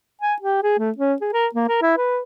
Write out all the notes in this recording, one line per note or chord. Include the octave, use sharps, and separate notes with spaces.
G#5
G4
G#4
A3
C#4
G#4
A#4
A#3
A#4
E4
B4